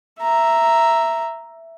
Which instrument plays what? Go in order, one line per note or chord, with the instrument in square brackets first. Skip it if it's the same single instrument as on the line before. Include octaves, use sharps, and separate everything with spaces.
[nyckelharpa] E5 A#5